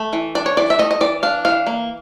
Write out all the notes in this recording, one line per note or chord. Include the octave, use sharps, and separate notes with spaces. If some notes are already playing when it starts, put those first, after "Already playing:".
Already playing: A3
E3
D4 D5
C#5
E3 D5
E5
A3 D#5
D#5
E3 D5
D4 F5
E3 F5
A#3